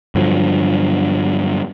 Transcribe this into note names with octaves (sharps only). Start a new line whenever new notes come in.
G2 D3 F3 F#3